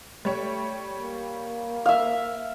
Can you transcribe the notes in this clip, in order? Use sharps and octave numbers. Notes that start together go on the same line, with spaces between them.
G3 A3 C#5
A#3
E5 F5